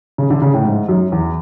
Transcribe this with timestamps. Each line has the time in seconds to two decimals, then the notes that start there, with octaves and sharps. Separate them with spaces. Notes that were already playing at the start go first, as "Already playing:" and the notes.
0.18 C#3
0.30 D3
0.42 C#3
0.54 A2
0.65 G#2
0.89 F#2
1.12 E2